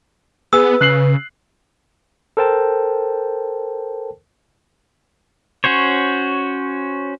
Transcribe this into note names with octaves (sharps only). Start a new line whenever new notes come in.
B3 G#4 B4 E6
C#3 F#6 C7 F#7
A4 A#4 C5 G5 A5
C#4 F#4 C5 C#5